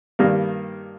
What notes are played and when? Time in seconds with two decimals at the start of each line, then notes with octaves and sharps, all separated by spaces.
0.19 G2 D#3 G3 A#3